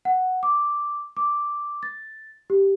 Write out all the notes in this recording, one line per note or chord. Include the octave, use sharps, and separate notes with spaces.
F#5
D6
D6
A6
G4